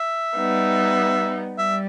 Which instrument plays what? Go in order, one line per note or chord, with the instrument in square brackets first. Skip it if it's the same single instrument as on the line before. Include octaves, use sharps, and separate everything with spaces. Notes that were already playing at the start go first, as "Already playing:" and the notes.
Already playing: [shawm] E5
[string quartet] G3 B3 D#4
[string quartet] G3 [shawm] E5